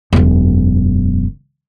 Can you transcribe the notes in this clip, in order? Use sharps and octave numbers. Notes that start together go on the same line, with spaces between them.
E1 F#2